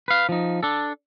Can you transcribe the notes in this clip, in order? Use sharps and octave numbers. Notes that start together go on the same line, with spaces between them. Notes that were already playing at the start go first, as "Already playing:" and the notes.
B4 F5
F3 D#4
D4 A4